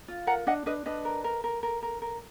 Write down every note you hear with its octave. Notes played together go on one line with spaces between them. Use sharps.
F4
A#4 F#5 A#5
D4 D#5 F#5
D4 B4 D#5
D4 B4 D#5
A#4
A#4
A#4
A#4
A#4
A#4